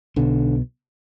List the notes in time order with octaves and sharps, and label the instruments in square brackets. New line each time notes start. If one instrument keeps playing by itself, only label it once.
[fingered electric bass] B1 B2 D3